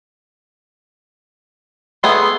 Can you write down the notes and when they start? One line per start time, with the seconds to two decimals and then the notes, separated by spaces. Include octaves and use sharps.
2.04 A3 B3 G#4 C6